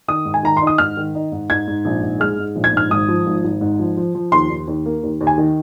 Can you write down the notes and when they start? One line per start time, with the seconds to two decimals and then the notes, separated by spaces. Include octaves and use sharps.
0.08 D#3 D#6
0.25 G#2
0.34 G#5
0.43 D#3 A#5
0.57 C6
0.62 D#4
0.67 D#6
0.78 G#2 F6
0.97 D#3
1.15 D#4
1.32 G#2
1.50 G#2 G#6
1.67 G#2
1.85 A#1
2.03 G#2
2.20 G#3 F6
2.38 G#2
2.56 A#1
2.64 G#6
2.73 G#2 F6
2.90 G#1 D#6
3.08 F3
3.27 G#1
3.44 G#1
3.61 G#2
3.79 F3
3.97 F3
4.15 F3
4.32 D#2 C6
4.50 D#2
4.68 D#2
4.86 A#3
5.03 D#2
5.21 D#2
5.27 G#5
5.38 D#3